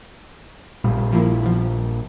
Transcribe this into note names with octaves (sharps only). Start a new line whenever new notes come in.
A#1 A#2 G3
F3 A#3 E4
F3 B3